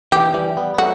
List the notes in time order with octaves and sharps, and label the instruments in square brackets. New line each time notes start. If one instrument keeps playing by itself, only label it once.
[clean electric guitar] E3 [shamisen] G4
[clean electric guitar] E3 G3
G3 B3
B3
[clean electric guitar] F#3 A3 [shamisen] F#4